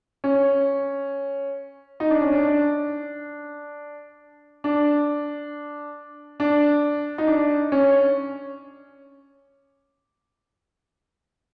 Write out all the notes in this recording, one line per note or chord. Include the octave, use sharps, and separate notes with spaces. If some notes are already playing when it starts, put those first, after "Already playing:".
C#4
D#4
D4
C#4
D4
D4
D4
D#4
D4
C#4